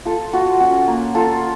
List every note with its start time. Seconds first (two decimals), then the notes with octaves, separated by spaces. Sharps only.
0.05 F4 A4
0.33 F4 F#4
0.60 C#4 F#4
0.88 A#3
1.15 F4 A4